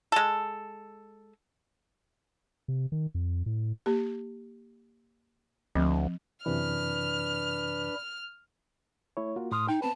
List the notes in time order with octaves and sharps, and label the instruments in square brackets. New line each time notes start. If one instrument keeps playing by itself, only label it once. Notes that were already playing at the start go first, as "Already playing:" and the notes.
[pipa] G#3 A4
[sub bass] C3
D#3
F2
A2
[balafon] A#3 G4
[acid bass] D2 [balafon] F3 C4
[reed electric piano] F#2 C3 E3 [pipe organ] D4 B4 [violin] F6
[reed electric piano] A3 E4 C#5
A#3 F4 F#4
[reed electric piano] A2 C6 F6 [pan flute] D#6
[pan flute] D#4 [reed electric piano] G5
[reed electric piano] B3 C4 B4 [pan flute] A5